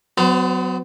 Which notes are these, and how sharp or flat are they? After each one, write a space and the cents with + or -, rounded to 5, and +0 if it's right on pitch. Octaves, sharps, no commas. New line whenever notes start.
F#3 +0 B3 +35 C5 -20